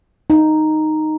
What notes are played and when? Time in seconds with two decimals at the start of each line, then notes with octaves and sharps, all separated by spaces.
0.30 D#4